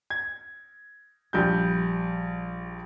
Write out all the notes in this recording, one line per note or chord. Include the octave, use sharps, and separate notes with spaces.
G#6
A#1 G3 G6